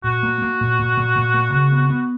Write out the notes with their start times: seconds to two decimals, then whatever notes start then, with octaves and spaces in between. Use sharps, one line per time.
0.04 A#2 F#4
0.23 A#3
0.42 A#3
0.61 A#2
0.79 A#2
0.97 A#2
1.16 A#2
1.34 A#3
1.53 C#3
1.72 B3
1.90 B3